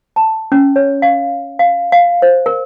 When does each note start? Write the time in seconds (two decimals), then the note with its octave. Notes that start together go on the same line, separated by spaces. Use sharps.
0.16 A5
0.52 C#4
0.76 C#5
1.02 F5
1.59 F5
1.92 F5
2.22 C5
2.46 A#4